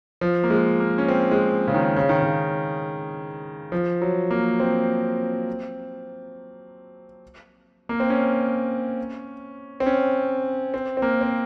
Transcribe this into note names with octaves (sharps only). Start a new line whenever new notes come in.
F3
A#3
G#3
A#3
C#4
C4
G#3
C#3
D#3
C#3
D#3
C#3
F3
F#3
A#3
C4
A#3
C4
C#4
C4
C#4
C4
C4
A#3
C4